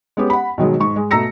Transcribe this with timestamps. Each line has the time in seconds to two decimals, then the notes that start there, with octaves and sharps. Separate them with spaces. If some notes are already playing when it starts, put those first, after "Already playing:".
0.17 G#3 B3 C#4 G4
0.30 F#5 B5
0.58 B2 D#3 F#3 G#3
0.80 G#2 C#6
0.96 G#3
1.11 B2 A3 A#5 E6 A#6 C#7